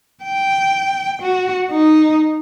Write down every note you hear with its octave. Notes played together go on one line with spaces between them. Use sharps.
G5
F#4
D#4